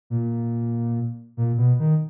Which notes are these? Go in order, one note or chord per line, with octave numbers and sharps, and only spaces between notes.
A#2
A#2
B2
D#3